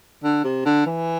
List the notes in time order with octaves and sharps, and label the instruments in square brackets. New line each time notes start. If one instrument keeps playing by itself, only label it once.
[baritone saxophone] D3
C3
D3
E3